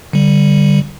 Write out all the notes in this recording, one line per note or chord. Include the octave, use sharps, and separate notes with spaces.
D3 G3